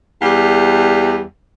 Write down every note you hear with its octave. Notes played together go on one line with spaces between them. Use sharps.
E2 G3